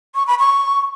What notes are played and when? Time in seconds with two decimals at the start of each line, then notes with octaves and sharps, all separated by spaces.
0.15 C#6
0.27 B5
0.39 C#6